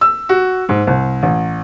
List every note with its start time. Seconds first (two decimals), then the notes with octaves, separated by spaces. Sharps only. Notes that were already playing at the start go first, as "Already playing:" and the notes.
0.01 E6
0.29 F#4
0.69 G#2
0.87 C2
1.23 A1